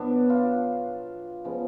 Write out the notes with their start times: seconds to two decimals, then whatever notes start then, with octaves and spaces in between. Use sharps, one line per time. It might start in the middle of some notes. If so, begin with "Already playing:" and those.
Already playing: B2 F#3 B3 D4
0.30 F4
1.44 C#3 F3 G#3 B3